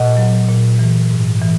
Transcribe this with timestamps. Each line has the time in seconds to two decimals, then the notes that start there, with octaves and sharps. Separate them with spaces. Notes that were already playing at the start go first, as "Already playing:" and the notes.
Already playing: A#2 D#5 F#5
0.17 F#3
0.48 A#2
0.79 E3
1.11 G#2
1.42 E3